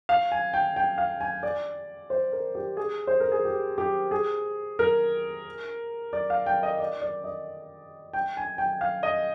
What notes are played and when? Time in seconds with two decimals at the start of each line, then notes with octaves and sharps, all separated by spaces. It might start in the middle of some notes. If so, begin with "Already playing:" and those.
0.09 F5
0.32 G#5
0.54 G5
0.76 G5
0.98 F5
1.21 G#5
1.43 D5
2.10 C5
2.32 A#4
2.55 G4
2.77 G#4
3.07 C5
3.20 A#4
3.32 G#4
3.45 G4
3.78 G4
4.11 G#4
4.79 A#4
6.13 D5
6.30 F5
6.46 G5
6.63 D#5
6.80 D5
7.02 D5
7.24 D#5
8.13 G5
8.37 G#5
8.58 G5
8.81 F5
9.03 D#5